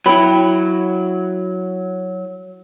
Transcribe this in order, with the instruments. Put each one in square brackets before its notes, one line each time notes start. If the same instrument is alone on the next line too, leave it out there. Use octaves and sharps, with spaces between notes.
[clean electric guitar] F#3 [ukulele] E4 G5 B5